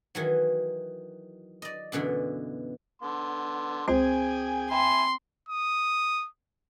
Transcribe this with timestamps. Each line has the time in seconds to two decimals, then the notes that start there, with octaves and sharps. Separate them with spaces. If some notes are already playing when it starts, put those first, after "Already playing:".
0.15 D#3 E3 F#3
1.62 D5 D#5
1.92 F#2 B2 D3 E3
3.02 D3 B3 C6
3.88 C#2 C4 G#4 C5 G5 G#5
4.71 E5 G5 G#5 B5 C6
5.49 D#6